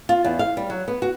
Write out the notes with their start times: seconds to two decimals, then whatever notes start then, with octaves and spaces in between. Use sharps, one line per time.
0.09 F4
0.24 E2
0.39 F5
0.57 G3
0.70 F#3
0.88 B3
1.02 F#4